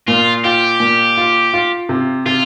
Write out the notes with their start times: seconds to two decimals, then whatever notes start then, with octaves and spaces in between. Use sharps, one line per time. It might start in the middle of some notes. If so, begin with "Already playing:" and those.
0.08 A#2 F4
0.44 F4 G4
0.80 A#2
1.17 F4
1.54 F4
1.89 C3
2.26 C3 F4